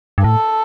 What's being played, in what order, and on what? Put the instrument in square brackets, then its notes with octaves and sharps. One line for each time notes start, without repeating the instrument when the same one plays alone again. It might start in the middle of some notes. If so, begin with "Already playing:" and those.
[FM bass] G2
[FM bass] A2 [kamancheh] A4